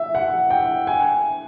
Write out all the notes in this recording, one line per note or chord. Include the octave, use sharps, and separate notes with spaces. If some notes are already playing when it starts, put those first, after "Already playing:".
Already playing: E5
F#5
G5
G#5